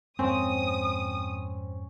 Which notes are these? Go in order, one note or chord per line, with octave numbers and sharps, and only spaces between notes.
F2 G#2 A#3 C4 C#4 D#6